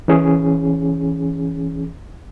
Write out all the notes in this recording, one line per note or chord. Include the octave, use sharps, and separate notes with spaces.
E3 C#4 G#4